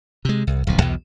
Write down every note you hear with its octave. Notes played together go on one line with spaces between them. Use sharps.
C3 G#3
C2
D1 B1 F3
B1 E2 B2